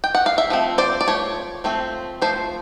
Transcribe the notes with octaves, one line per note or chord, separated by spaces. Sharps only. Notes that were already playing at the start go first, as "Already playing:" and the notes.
G5
F#5
F5
E5
F3 A3 C4
C5 D5
D5
F3 A3 C#5
F3 A3 C4
F3 A3 C5